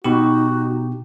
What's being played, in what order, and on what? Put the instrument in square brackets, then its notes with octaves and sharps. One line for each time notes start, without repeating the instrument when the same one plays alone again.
[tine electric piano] B2 G4 [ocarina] D#4 [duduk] F#4